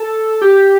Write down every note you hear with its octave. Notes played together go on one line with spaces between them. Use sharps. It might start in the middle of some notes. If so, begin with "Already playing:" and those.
Already playing: A4
G4